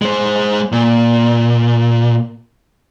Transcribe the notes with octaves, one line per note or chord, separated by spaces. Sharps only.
G#3 C5
A#2